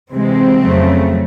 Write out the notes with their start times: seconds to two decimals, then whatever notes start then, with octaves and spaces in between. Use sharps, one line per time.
0.10 C3 E3 G#3 C4
0.62 F2 C#3 F#3 A3